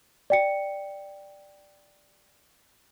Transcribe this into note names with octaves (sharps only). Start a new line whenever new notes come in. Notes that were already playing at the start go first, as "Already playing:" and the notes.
D5 G5 C#7